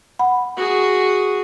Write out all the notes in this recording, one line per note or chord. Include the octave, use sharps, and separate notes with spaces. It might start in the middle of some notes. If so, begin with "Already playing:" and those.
F#5 B5
F#4 G#4